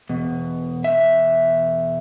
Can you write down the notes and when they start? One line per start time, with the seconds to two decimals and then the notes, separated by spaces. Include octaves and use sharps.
0.10 E2 B2
0.84 E5